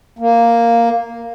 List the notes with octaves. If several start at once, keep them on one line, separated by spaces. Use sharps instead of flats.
A#3